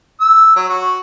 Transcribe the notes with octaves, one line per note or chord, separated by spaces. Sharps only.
E6
F#3
F#4